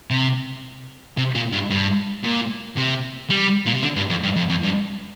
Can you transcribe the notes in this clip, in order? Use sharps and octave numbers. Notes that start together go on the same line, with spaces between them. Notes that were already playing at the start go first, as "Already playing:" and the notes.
C3
C3
A#2
G2
G2
A#2
C3
G3
A#2
C3
D3
G2
F2
G2
F2
F2
G2